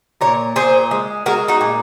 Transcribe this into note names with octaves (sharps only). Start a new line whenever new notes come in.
A#2 A#4 C#5
A#2 G#4 C5
G#3
G#3 F#4 A#4
D#4 F#4
A#2